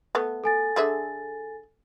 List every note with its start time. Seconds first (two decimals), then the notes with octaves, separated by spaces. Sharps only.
0.15 A3 B3
0.44 A4 G#5 A6
0.76 D3 G#4 E5